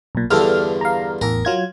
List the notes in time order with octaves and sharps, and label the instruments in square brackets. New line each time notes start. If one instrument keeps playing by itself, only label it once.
[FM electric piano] B1 A#2
[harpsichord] E2 G2 D3 [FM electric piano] A4 F6
[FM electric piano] F5 A#5
[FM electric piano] A1 E2 [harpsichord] A#4
[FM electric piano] F#3 F4 G#6